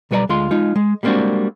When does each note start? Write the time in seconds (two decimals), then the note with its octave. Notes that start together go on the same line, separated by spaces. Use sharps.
0.11 B1 G3 B4 C#5 D5 A#5
0.29 D2 G#3 F4 C6
0.51 G#3 D#4 F4
0.76 G#3
1.03 G3 G#3 A#3 C4 D4 F#4